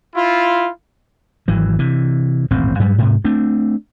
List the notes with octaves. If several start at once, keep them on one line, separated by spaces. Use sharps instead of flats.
E4 F4
G#1 E3 F#3
C3 E3
D#1 A1 G#2 C4
G2 F#3 G3
G#2 C3
A3 C4 D4